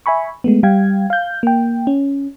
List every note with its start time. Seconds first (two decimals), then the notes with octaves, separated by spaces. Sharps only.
0.06 E5 G#5 B5 C#6
0.44 G#3 A3 B3
0.63 G3 F5 G5 G#6
1.10 F5 G6
1.43 A#3 G5
1.87 C#4